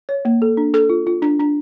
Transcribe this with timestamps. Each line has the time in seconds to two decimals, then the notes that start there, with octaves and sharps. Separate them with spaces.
0.09 C#5
0.25 A#3
0.42 A4
0.57 D4
0.74 A4
0.90 F4
1.07 F4
1.22 D4
1.40 D4